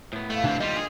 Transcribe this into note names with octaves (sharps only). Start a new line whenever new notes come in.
A2 B3
D2 A3 F5
C3 E3 C4 D4
D#2 G3 F4 D#5
A#3 D4 G#4